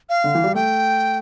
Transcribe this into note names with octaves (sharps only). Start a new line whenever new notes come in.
F5
D3
E3
G3
A3 G5